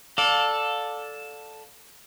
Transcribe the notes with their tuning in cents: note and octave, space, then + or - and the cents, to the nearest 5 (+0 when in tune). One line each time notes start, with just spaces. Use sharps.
A4 +0 D5 +0 F5 +35